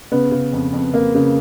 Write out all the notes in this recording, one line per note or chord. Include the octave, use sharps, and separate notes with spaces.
C#3 B3
C#3
F2
F2
F2 A#3
C#3